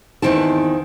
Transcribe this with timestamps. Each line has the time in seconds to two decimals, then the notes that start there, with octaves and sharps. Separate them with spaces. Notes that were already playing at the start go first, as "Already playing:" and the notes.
0.22 E2 G2 D#3 C4 E4 A5